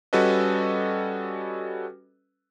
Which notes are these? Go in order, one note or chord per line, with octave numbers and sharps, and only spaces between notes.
G3 C#4 F#4 A4 B4 D#5